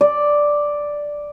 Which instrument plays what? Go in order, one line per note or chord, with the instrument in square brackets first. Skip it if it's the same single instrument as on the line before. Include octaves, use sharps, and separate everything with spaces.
[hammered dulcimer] D5